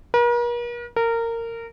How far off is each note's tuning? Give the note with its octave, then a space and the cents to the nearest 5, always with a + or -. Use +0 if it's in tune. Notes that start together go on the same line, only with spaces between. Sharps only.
A#4 +45
A#4 -20